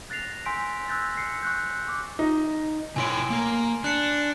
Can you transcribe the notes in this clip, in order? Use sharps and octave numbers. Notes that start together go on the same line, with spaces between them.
F#6 A6 A#6 C7 F7
G#5 C6 E6 G6 B6 D7
E6 F#6 G6 A6 A#6
C7 C#7
C#6 F#6 G6
C#6 D6
D#4
B2 E4 C#5 G#5 C6 D7
A#3 A#4
D4 F#6 C#7